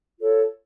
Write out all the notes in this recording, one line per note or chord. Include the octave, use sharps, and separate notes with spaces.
F4 A4 C#5